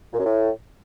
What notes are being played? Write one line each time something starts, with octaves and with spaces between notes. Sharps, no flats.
A#2
F#2
A2